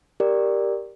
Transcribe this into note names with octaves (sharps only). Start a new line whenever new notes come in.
G4 A#4 D5